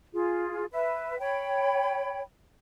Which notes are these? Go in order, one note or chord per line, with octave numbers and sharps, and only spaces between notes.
F4 G#4
B4 E5
C#5 G5 B5